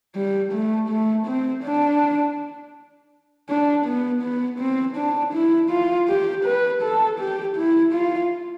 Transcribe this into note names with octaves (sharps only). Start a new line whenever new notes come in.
G3
A3
A3
C4
D4
D4
B3
B3
C4
D4
E4
F4
G4
B4
A4
G4
E4
F4